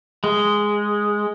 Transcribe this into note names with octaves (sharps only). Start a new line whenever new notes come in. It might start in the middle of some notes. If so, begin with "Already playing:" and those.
G#3